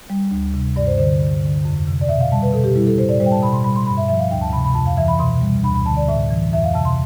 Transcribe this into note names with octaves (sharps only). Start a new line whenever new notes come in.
G3
D2
C3
G2 D5
C5
D3 C5
G2
D3
F2
C3
D5
B2 E5
F5
G3 A5
B4
B2 A4
G4
G3 E4
A4
A2 C5
D5
G3 C5
G5
A5
B2 B5
C6
G3 B5
C6
G2 B5
E5
F3 E5
F5
D2 G5
A5
C3 B5
B5
F2 A5
F5
E3 E5
B5
B2 C6
G3
D2 B5
B5
D3 A5
D5
A2 E5
E3
F2 E5
F5
C3 A5
C6